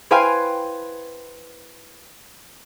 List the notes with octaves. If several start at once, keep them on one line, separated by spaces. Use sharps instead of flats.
E4 B4 C5 F5 G5 G#5